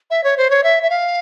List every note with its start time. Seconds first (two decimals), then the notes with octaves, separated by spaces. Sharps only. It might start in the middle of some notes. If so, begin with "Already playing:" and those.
0.10 E5
0.24 C#5
0.37 C5
0.50 C#5
0.63 E5
0.83 E5
0.90 F5